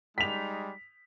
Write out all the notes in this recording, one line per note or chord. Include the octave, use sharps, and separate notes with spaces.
G3 G#3 D#4 B6 F7